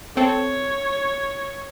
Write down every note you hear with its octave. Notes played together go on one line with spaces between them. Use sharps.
C4 A4 C#5